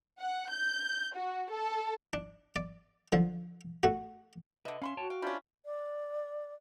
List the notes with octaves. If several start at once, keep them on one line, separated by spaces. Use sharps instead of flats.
F#5
G6
F#4
A4
D4
D5
D3 F3
A3 F#4
D3 B4 D#5 E5
C#4 E5 F5 B5 C6
F#4 C#5 G5 A5
F5 G5
C3 C#4 D4 F4 B5
D5